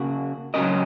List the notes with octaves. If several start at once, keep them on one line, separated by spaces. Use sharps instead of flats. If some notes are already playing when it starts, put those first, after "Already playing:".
Already playing: C#3 A#3 F#4
C#3 F#3 C#4 A#4 D#5